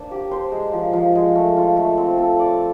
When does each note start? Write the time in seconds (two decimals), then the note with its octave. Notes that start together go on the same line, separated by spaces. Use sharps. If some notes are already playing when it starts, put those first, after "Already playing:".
Already playing: A#3 D4 C5
0.11 G4
0.31 C5
0.52 G#3
0.73 F3
0.93 F3
1.15 G#3
1.35 A3
1.57 F4
1.77 A3
1.98 C4
2.18 A4
2.39 D5